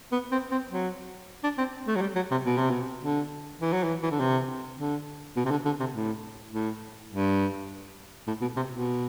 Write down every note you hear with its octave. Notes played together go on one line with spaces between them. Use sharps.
B3
C4
C4
F#3
D4
C4
A3
F#3
G3
F#3
C3
B2
C3
B2
D3
E3
F#3
E3
E3
D3
C3
D3
B2
C3
D3
D3
C3
A2
A2
G2
A2
B2
C3
B2